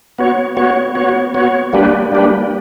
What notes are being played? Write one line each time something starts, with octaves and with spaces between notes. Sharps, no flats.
B3 F#4 C#5
B3 F#4 C#5
B3 F#4 C#5
B3 F#4 C#5
G3 A#3 D4 G4 B4
G3 A#3 D4 G4 B4